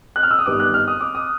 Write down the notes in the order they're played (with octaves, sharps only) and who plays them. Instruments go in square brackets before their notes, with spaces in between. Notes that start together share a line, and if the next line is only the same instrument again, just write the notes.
[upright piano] F#6
F6
E6
D#6
G1 G2 D#3 G3 D6
F#6
F6
D#6
D6
D#6